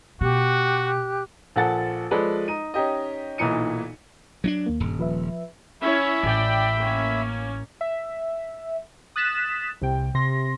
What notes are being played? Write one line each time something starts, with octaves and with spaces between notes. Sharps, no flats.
B2 F#4 G4 F#6
A#1 F3 A4 F#5 A5 A6
F3 G#3 A4 B4 D5
D#4 D#7
C#4 D#4 G4 D#5
B1 A#2 E3 D#4 C#7 D#7
F#3 C#4 D4
D#2 A#3
D#1 G2
F3 B4 E5
C#4 E4 C#5 E5 B5
A1 D5 G5
A#3 C#4
E5
D#6 F#6 A6 B6 E7
C2 C3 G5
C3 C6 A#6